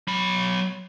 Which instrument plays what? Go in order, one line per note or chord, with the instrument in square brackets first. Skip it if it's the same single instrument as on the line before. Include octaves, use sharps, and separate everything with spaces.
[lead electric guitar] F#3 B5